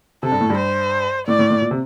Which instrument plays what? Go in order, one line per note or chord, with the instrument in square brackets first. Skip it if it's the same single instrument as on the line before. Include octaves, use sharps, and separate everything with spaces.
[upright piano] C3 [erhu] A4
[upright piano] G2
A2
G2
[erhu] C5
[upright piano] A2 [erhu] D5
[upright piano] A2
A2
A#2
C3